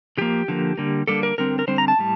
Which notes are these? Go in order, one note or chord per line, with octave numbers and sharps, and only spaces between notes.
D3 F3 A#3 G4
D3 F3 A#3
D3 G3 A#3
D3 G3 A#3 A4
A#4
D3 G3 C4 A#4
A#4
D3 G3 C4 C5
A#5
A5
A2 G3